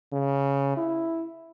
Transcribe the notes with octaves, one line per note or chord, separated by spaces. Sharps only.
C#3
E4